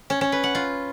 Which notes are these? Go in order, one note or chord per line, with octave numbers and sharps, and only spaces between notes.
C#4
C#4
B4
F#5
F4